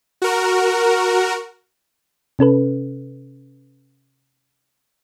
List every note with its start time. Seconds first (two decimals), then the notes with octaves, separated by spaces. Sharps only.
0.22 F#4 A#4
2.39 C3 C#4 A4 B4